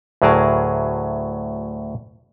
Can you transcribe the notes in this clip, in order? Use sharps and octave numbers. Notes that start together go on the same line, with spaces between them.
D2 A2 F#3 G#4 A#4 A5